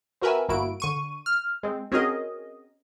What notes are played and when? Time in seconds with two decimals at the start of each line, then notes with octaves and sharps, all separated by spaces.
0.22 C4 F#4 A#4 B4 E5 G#5
0.48 G1 A#3 E4 F#4 D7
0.80 D3 C#6 D#7
1.26 F6
1.63 G#3 C4
1.92 C4 C#4 F#4 G#4 A#4 D#5